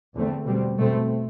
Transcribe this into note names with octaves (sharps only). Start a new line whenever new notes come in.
E2 D3 A3 C4
B2 G3 C4
B2 A3 C4